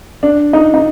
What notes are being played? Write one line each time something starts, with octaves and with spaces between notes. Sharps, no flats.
D4
D#4
D#4